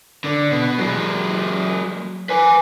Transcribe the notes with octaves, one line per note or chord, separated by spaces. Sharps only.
D3
B2
F#3 G#3
B4 G#5